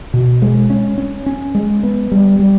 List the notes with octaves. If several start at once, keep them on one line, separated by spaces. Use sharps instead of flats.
B2
G#3
C#4
C#4
C#4
G#3
B3
G3
G3